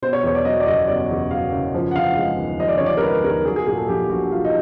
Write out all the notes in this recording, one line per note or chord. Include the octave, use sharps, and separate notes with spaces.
B2 C5
C#5
E2 C#5
D5
F#3 D#5
D5
F#1 D#5
B2 D5
E2
F#3 F5
F#1
F3
F#5
D3 F5
G#3
D#2
F3 D#5
D5
D3 C#5
D5
A#4
G#3 B4
D#2 A#4
F#3 G#4
G#4
A#2 G#4
A4
A#1 G4
A#1 F#4
F#3 F4
D#4